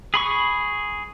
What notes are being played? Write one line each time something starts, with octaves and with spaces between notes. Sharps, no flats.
G#4 B5 C#6